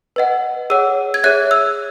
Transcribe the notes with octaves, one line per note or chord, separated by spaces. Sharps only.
B4 D#5 F#5
G#4 C#5 F#5 E6
G#6
G#4 C#5 E5 F#6
E6